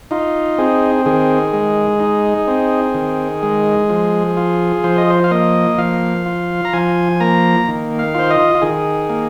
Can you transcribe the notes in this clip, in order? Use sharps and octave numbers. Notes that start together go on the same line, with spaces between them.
D#4 F4
C4 G#4
D#3 G#4
G#3
D#4
C4
D#3
G#3
F3
F4
F3 C5
D#5
C5
F5
A#3 D#5
F3 F5
F4
A#5
F3 G#5
A#3 A#5
D#3
F5
F4 C5
D#5
F4
D#3 G#4
A#3